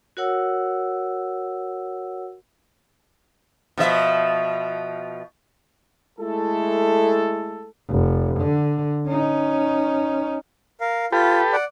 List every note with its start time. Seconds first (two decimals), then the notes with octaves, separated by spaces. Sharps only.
0.17 F#4 A#4 C#5 F#5 E6
3.78 B2 F3 E5
6.19 G#3 A3 E4 A4
7.89 F1
8.40 D3
9.07 C#4 D#4
10.81 A#4 F5
11.12 F4 G4 A4 B4
11.53 D5 F#5